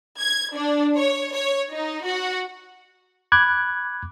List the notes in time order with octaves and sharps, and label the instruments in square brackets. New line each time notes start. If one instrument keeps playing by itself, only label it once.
[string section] G#6
D4
C#5
C#5
D#4
F#4
[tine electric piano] B5 D6 F#6 G#6